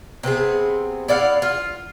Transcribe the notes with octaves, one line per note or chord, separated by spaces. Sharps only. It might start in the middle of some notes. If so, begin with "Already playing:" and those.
C3 B3 C4 G#4
E4 D5 F5 F#5
F4